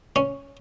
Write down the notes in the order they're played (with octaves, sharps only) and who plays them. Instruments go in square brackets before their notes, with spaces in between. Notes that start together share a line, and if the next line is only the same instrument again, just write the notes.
[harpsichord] C#4